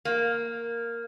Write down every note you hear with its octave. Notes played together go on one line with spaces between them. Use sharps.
A#3